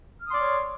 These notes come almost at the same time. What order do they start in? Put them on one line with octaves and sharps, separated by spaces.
F6 D#6 C6 D5 C#5